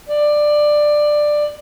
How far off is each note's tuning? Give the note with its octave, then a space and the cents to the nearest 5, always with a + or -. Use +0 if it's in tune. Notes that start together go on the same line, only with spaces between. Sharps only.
D5 +15